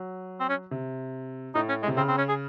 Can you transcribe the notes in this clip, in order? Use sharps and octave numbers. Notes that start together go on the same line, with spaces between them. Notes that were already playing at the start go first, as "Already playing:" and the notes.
Already playing: F#3
C4
C#4
C3
A2 D#4
C#4
G#3
C3
C#3 C4
C4
C#4
G#4